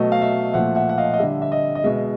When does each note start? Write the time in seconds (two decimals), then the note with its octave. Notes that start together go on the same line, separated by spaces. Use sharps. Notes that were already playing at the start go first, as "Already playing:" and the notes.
Already playing: B2 F#3 A3 D#5
0.12 F5
0.22 E5
0.54 A#2 F3 A3 E5 F#5
0.75 E5 F#5
0.89 F#5
0.98 D#5 F5
1.14 D#5
1.19 D3 G3 E5
1.42 E5
1.52 D#5
1.75 D#5
1.84 B2 G#3 E5